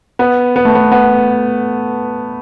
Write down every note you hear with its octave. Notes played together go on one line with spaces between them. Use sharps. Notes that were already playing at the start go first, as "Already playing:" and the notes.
B3
B3
A3
B3
B3